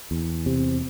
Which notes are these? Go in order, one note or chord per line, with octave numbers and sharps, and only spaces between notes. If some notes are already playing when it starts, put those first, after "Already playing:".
E2
C3